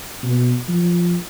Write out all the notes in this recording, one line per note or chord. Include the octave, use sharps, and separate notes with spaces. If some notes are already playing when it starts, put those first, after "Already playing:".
B2
F3